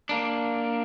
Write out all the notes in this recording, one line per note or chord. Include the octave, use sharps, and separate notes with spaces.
A#3 D4